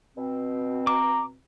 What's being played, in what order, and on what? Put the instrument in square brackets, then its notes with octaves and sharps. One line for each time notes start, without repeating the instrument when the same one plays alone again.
[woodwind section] B2 C4
[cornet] A#5 [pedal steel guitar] D6